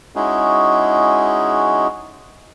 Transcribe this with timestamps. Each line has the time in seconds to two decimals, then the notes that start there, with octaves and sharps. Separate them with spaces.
0.16 G#3 C#4 D#4 E4 F#4 G#4